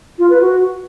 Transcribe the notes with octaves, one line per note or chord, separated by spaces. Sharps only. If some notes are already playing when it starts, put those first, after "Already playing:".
F4
B4
F#4